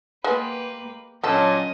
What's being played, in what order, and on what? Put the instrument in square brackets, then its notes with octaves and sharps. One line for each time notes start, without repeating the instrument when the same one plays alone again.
[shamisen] G#3 B3 [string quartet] A#3 G4 B4
[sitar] A#2 [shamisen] D3 A4 [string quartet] F#3 C#4 C#5 [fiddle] D#5